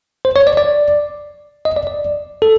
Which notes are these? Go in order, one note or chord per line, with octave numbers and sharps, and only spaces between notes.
C5
C#5
D5
D5
D#5
D5
D5
A4